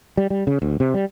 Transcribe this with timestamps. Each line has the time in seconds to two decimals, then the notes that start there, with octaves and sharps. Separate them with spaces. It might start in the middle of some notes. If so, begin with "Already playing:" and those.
0.17 G3
0.30 G3
0.47 C#3
0.62 D2
0.80 C3
0.94 G3